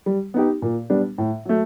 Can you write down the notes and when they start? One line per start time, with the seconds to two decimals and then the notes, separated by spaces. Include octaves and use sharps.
0.06 G3
0.34 B3 D#4 G4
0.62 A#2
0.90 G3 B3 D4
1.18 A2
1.45 F#3 A3